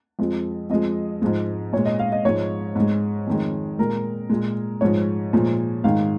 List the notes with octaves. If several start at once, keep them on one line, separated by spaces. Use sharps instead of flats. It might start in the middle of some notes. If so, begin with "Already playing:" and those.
F2 F3 G#3
F2 F3 G#3 D#5
G#2 F3 G#3
A#2 G#3 C#5
D#5
F5
D#5
G#2 F3 G#3 C#5
G#2 G#3
F2 D#3 G#3
A#2 G#3 A#4
A#2 G#3
G#2 F3 G#3 C#5
A#2 F3 G#3
G#2 D#3 G#3 F5